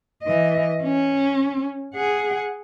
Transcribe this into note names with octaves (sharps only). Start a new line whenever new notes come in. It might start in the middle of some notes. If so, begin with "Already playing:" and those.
E3 D#5
C#4
G#4 F#5